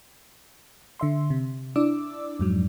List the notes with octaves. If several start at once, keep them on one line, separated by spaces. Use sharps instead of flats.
D3 E5 C6
C3
D4 E4 D5 D6 E6
F2 G#2 F#3